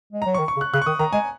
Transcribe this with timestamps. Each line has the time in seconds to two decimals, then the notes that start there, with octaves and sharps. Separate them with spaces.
0.13 G#3
0.22 A#5
0.26 F#3
0.34 C#6
0.39 D#3
0.48 C#6
0.57 C#3
0.61 F#6
0.74 C#3 F#6
0.82 C#6
0.86 D#3 D#6
0.99 D#3 A#5
1.13 G#3 G#5